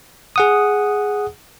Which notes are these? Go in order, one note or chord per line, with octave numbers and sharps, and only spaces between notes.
G#4 F#5 D#6